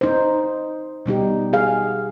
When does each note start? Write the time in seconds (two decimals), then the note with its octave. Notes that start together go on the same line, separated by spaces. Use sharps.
0.01 D#4 C5
1.06 B2 G3 D#4 G4
1.53 G#4 F5